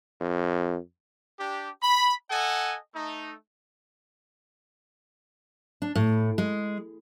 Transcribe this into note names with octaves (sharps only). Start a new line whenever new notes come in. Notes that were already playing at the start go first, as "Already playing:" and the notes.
F2
D4 G4
B5
A4 D#5 F#5 G#5
A3 D#4
D4
A2
G#3